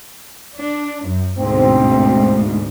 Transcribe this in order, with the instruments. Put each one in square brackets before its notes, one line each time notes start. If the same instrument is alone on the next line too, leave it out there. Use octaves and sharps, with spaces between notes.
[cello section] D4
F#2
[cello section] D2 G#2 B2 [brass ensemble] C4